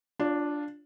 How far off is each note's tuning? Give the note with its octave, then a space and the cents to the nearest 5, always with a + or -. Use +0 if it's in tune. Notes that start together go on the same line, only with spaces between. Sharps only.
D4 +0 F4 +0 C#5 +40